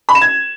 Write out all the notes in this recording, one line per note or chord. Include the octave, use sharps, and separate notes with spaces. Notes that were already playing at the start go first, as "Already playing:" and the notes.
B5
E7
G#6